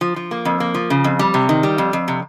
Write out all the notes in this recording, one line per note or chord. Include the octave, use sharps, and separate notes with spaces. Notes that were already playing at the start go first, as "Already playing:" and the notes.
F3
F3
A#3
F2
A#3
F3
C#3
F2
G3
C3
D#3
G3
F2
F2
C3